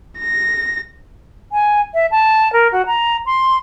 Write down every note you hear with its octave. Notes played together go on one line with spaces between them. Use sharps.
A#6
G#5
E5
A5
A#4
F#4
A#5
C6